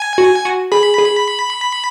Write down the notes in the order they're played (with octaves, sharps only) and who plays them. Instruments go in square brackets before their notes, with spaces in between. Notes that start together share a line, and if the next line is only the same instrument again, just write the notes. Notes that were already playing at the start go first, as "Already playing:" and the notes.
Already playing: [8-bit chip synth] G#5
[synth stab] F#4
F#4
[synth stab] G#4 [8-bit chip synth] B5
[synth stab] G#4